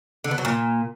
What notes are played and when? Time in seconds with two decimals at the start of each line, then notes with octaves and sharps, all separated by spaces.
0.24 D3
0.31 B3
0.38 F#3
0.45 A#2